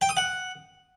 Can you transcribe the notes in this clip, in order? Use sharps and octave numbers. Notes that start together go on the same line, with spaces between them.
G5
D#6
F#5